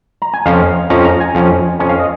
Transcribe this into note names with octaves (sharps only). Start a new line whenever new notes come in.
A#5
G#5
F2 F3 C#4 F5
F2 F3 C#4 A#5
A#5
G#5
F2 F3 C#4
F2 F3 C#4 G#5
F5
D#5